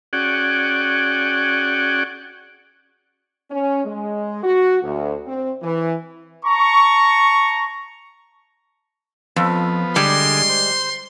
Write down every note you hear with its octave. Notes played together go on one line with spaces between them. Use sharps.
C#4 F#4 G#4 D5 F#5 G5
C#4
G#3
F#4
D2
C4
E3
A5 A#5 C#6
F2 F3 B3
D3 G3 G#3 G#4 C6
C5